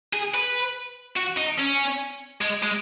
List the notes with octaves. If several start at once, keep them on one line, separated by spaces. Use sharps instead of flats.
G#4
B4
F#4
D#4
C#4
G#3
G#3